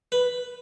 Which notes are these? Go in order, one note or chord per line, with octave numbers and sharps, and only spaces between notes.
B4